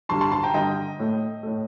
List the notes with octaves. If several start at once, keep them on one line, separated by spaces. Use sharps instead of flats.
G2 D3 G3 A5 C6
A5 C6
A5 C6
G5 A#5
G2 D3 G3 D#5 G5
A2 A3
A2 A3